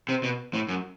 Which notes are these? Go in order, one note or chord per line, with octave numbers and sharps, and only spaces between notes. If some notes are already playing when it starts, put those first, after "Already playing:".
C3
B2
A2
F#2